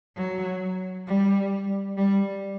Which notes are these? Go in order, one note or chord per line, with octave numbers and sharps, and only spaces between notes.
F#3
G3
G3